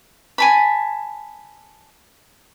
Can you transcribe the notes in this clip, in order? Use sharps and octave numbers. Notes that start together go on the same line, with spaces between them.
G#5 A5 B5